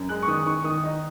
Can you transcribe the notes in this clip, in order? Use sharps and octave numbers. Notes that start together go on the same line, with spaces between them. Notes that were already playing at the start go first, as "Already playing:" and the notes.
Already playing: F#2
G#3 F#6
C#6
D#3 D#6
D#3 C#6
D#3 D#6
D#4